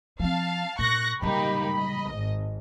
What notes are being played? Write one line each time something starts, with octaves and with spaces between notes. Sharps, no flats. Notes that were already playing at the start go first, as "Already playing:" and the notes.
F3 C4 F5 A5
A#2 C#6 F#6 A#6
C#3 G3 A#3 D#4 G4 B5
D#5
G#1